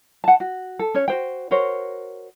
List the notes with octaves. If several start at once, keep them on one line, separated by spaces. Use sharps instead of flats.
F#5 A5
F#4
A4
C#4 C#5
F#4 C5 G5
F#4 A#4 C5 C#5